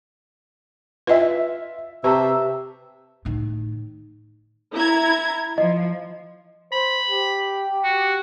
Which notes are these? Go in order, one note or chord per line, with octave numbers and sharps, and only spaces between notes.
F4 B4 D#5 E5
C3 B4 E5 A5 A#5 C#6
A2 D#3
E4 A#5 G#6
F3 D#5
C5 B5
G4
F#4